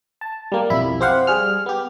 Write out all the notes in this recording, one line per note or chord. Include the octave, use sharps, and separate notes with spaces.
A5
G3 A#3
B1 F2 E4 B5
C4 G4 C5 F5 F#5
G3 G#4 F6
B3 G4